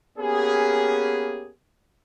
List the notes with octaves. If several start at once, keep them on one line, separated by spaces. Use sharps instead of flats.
A#3 B3 C#4 G4 G#4